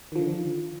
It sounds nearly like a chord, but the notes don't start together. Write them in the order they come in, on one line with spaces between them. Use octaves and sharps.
D#3 F3 D3